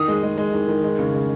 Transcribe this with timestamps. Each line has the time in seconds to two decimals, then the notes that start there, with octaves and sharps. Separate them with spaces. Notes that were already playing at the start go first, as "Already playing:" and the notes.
Already playing: D#3 D#6
0.08 G#3
0.23 G#3
0.38 G#3
0.54 D#3
0.68 D#3
0.84 G#3
0.99 C#3
1.14 G#3